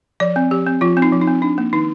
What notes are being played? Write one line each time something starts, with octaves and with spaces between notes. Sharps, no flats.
F3 D5
C4
F3 G4
C4
F3 F4
C4
D#4
F3
D#4
C4
D4
A#3
D#3 D#4